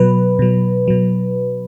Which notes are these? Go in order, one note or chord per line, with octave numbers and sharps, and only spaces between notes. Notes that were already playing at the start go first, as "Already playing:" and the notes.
Already playing: B2 F#3 B4
B2 F#3
B2 F#3